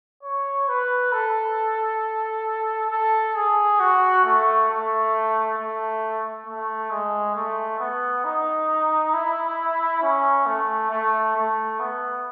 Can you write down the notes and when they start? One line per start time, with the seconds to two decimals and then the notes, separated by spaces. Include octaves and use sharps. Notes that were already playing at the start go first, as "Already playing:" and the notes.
0.23 C#5
0.69 B4
1.13 A4
2.91 A4
3.36 G#4
3.80 F#4
4.24 A3
4.69 A3
5.58 A3
6.47 A3
6.91 G#3
7.36 A3
7.79 B3
8.25 D#4
9.14 E4
10.02 C#4
10.46 A3
10.91 A3
11.36 A3
11.80 B3